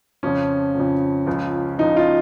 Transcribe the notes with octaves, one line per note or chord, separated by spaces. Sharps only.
F2 C#3 F3 C#4
F2 C#3 F3
C#2 C#3 F3
C#2 C#3 F3 D#4
F4